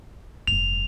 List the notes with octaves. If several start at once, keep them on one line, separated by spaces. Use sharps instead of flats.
F1 G2 F7